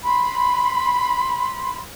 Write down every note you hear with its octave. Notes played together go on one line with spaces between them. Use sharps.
B5 C6